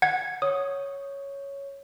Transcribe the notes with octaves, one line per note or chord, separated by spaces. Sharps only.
F#5 G#6
C#5 D#6